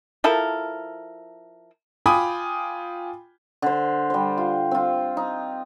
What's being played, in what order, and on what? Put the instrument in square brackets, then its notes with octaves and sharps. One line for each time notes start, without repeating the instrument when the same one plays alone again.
[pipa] F3 E4 A4 A#4
[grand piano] F4 G5 G#5 B5 D6 D#6
[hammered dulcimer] D3 C5
G3 C5
F4
C4 F4
D#4